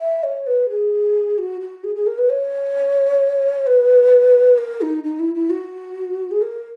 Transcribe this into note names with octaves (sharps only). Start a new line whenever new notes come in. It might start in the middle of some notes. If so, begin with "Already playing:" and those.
E5
C#5
B4
G#4
F#4
F#4
G#4
G#4
A#4
B4
C#5
B4
A#4
D#4
D#4
E4
E4
F#4
G#4
A#4